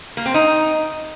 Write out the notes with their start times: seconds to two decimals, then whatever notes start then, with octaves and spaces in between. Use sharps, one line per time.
0.17 A#3
0.26 C4
0.34 D#4